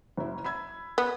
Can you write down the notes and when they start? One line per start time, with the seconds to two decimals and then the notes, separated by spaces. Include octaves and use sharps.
0.17 F#1 F#2 E4
0.44 B5 E6 G#6
0.98 B3